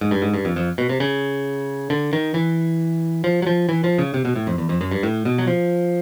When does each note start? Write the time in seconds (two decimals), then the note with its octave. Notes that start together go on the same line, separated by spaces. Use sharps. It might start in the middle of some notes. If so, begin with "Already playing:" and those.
0.01 G#2
0.11 G2
0.22 G#2
0.34 G2
0.45 F2
0.56 F2
0.78 B2
0.89 C3
1.00 C#3
1.90 D3
2.13 D#3
2.34 E3
3.24 F3
3.42 F#3
3.47 F3
3.69 E3
3.84 F3
3.98 C#3
4.14 C3
4.25 B2
4.36 A2
4.47 F2
4.58 E2
4.69 F2
4.81 F#2
4.91 G2
5.03 A2
5.25 B2
5.38 F#3
5.47 F3